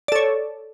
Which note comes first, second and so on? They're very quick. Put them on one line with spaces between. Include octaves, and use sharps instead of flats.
D5 A4 C#5